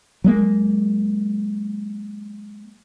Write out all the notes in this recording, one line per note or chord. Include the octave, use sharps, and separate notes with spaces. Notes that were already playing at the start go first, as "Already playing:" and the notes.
F#3 G#3 A#3